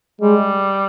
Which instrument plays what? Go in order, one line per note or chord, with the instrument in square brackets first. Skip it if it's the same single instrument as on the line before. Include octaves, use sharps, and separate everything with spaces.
[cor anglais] G3 [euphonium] G#3